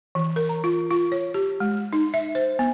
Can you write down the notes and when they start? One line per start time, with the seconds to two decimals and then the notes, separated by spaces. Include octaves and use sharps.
0.15 E3
0.36 A#4
0.49 A#5
0.64 F4
0.90 F4
1.12 C#5
1.34 G4
1.60 G#3
1.93 D#4
2.14 E5
2.35 C5
2.59 B3